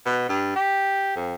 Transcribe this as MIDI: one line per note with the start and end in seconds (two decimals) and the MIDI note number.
0.06 0.26 47
0.29 0.53 43
0.56 1.14 67
1.16 1.35 41